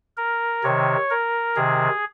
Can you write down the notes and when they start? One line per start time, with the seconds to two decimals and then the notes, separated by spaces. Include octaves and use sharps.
0.17 A#4
0.64 C3 D#3 C#5
1.10 A#4
1.56 C3 D#3 G#4